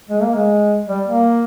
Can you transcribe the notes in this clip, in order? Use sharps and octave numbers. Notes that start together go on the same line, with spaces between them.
G#3
A#3
G#3
G3
A#3